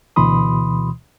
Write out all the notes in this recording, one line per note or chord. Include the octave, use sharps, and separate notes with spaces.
D2 B2 E3 B5 C6 D#6